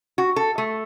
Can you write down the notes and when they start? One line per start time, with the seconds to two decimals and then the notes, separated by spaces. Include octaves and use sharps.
0.18 F#4
0.36 A4
0.58 A3